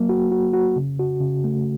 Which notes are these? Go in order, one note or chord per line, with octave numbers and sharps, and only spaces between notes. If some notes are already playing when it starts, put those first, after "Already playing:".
Already playing: F#3 A#3
F#4
F#4
F#4
C#3
F#4
C#3
A3